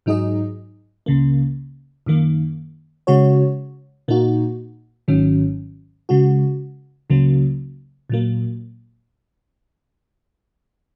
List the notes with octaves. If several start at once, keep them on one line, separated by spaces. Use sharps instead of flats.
G#2 F#3 D#4 G#4 D#5
C#2 C#3 A#3
F#2 D#3 A#3
C#3 G#3 F#4 C#5
A#2 A#3 D#4 F#4
G#1 G#2 D#3 F#3 C#4
C#3 G#3 F#4
C#2 C#3 F#3 A#3
A#2 F#3 A#3